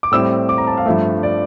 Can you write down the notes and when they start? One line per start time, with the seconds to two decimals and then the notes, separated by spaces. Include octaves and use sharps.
0.03 D6
0.11 A2 G3 C4 E4 E6
0.49 D6
0.58 A#5
0.67 A5
0.77 F5
0.86 G2 F3 A3 E5
1.23 D5